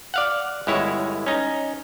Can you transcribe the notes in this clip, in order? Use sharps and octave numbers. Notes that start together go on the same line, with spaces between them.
D5 F5 F#5
G1 G#3 E4 C#5
C#4 D#4